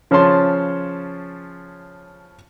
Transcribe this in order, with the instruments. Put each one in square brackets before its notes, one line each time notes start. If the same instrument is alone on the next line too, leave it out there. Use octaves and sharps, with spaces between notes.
[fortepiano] C#3 F3 C#4 C#5 A5 C6